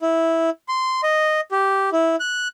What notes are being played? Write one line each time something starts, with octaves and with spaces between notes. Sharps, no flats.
E4
C6
D#5
G4
E4
F#6